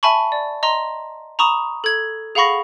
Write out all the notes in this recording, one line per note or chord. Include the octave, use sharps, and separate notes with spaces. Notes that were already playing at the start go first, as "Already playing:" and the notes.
E5 G#5 A5 B5 C#6
D5
D#5 A#5 C6
A#5 B5 C#6 D#6 E7
A4 G#6
G#4 F5 F#5 B5 C#6 A#6